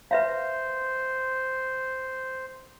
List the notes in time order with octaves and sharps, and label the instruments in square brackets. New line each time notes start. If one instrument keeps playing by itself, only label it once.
[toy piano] B4 E5 F5 [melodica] C5